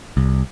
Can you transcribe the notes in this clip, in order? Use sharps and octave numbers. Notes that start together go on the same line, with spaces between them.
C2